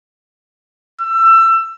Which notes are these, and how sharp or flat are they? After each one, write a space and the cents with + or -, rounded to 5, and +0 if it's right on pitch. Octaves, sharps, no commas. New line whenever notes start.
E6 +25